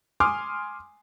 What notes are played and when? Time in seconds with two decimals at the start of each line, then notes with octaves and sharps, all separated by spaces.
0.20 G#5 C6 D6 D#6 F6